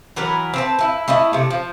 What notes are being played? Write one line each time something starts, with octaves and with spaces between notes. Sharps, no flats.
E3 F#3 A#4 B4
C4 B4 A5
E4 B4
A3 E4 B4 D#5
C3 A3
F3